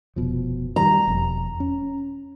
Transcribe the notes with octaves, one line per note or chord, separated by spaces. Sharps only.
F1 B2 F3
D#3 G3 A#5
E1 F2
C#4